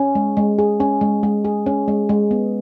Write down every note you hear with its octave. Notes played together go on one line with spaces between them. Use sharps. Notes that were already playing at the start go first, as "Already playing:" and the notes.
Already playing: C#4
G#3
G#3
G#4
C#4
G#3
G#3
G#4
C#4
G#3
G#3
B3